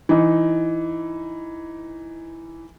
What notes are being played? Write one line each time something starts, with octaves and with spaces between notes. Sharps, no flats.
E3 D#4